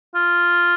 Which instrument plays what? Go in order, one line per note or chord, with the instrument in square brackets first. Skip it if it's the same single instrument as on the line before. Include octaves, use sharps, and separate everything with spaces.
[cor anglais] F4